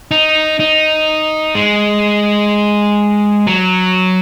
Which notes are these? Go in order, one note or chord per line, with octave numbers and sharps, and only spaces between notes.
D#4
D#4
G#3
F#3